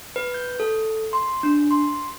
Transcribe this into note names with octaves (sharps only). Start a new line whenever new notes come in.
B4
G6
A4
C6
D4
C6